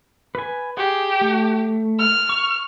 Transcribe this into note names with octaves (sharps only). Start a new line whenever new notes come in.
B4 G#5
G4 G#4
A3
F6
C#6